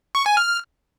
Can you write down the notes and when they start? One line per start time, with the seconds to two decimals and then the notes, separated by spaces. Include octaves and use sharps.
0.15 C#6
0.26 G#5
0.37 F6